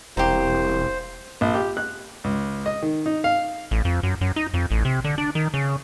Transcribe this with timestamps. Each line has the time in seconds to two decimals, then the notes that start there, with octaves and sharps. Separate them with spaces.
0.17 E1 C2 A#3 G4 C5
1.41 A#1
1.54 G4
1.77 F#6
2.24 C#2
2.66 D#5
2.82 D#3
3.06 D#4
3.24 F5
3.71 A1
3.85 F2
4.03 F#2
4.21 F#2
4.36 D#4
4.54 F2
4.71 A1
4.85 C3
5.04 D3
5.18 D4
5.35 D#3
5.54 C#3